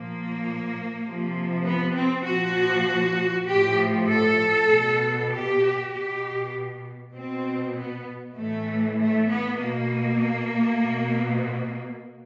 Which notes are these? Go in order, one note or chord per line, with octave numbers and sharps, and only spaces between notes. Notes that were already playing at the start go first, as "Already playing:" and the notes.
Already playing: A#2 F3 A#3
C3 F3
B3
C4
A#2 F3 F#4
A2 F3 G4
A4
B2
G4
B2 G4
B2 C4
B3
A2 E3 A3
A3
B3
B2 A#3
B2